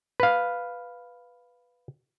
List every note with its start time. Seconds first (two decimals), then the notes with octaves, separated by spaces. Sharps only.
0.20 B4 F5